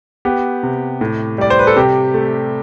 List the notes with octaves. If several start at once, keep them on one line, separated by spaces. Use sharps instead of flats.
B3 G4
C3
A2
G3 D5
C5
B4
A4
C3 G4
A3